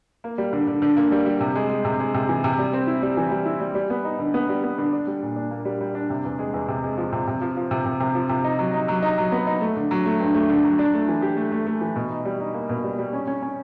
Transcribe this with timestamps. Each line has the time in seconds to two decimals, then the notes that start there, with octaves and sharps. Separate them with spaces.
0.24 A#3
0.38 G3
0.53 D3
0.68 D3
0.82 D3
0.97 A#3
1.12 G3
1.26 G3
1.40 C3
1.55 G#3
1.70 G#3
1.85 C3
2.00 G#3
2.14 C3
2.29 E3
2.44 C3
2.59 G3
2.73 C4
2.87 E4
3.02 G3
3.17 E3
3.31 G3
3.46 E4
3.61 G3
3.75 G3
3.90 B3
4.04 D#4
4.19 D3
4.34 B3
4.49 G3
4.64 B3
4.78 D3
4.93 D4
5.07 G3
5.22 A#2
5.36 D4
5.51 A#3
5.65 G3
5.81 G3
5.95 D4
6.10 C3
6.25 E2
6.39 G#3
6.54 E2
6.68 C3
6.84 G#3
6.98 F3
7.12 C3
7.27 C3
7.41 F3
7.57 F3
7.71 C3
7.86 C3
8.00 C3
8.15 F3
8.29 C3
8.44 D#4
8.59 F#3
8.74 D#4
8.88 F#3
9.02 D#4
9.18 F#3
9.32 B3
9.47 D#4
9.61 A3
9.76 D3
9.91 F#3
10.06 A3
10.20 G2
10.35 A3
10.50 D3
10.64 F#3
10.79 D4
10.94 A3
11.09 E3
11.22 G4
11.37 A3
11.52 A3
11.67 A3
11.81 E3
11.96 B2
12.10 D#4
12.25 G3
12.40 D#4
12.54 A#3
12.69 B2
12.84 G3
12.98 G3
13.13 C#4
13.27 C#4
13.42 C#4